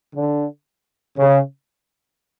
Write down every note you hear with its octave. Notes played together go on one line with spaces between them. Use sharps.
D3
C#3